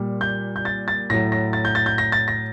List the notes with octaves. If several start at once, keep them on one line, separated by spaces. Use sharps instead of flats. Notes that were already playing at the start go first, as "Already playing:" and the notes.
Already playing: A#2 G3
G6
G6
A6
A6
A2 F#3 A#6
A#6
A6
G6
A6
G6
A#6
A6
A#6